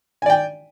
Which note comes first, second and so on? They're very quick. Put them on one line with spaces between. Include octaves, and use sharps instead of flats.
G#5 D5 G5